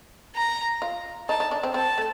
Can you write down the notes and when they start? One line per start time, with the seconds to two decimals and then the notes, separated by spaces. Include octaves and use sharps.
0.35 A#5
0.82 F4
1.29 D#4 A5
1.40 D#4
1.51 D4
1.63 C4
1.74 C4 A5
1.98 A3